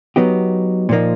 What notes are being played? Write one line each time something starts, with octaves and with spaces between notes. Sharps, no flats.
F#3 B3 D#4 G4
A#2 F3 A#3 D#4